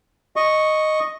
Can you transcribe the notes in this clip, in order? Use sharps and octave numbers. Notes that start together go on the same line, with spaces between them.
D#5 C#6